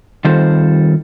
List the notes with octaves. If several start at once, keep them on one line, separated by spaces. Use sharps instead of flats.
D#3 G3 C4 F4 A4 C5